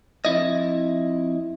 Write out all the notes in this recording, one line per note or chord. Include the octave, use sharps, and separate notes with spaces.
F2 E4 D#5